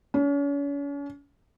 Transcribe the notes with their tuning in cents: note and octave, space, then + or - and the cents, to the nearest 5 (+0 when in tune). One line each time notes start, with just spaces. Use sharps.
C#4 +40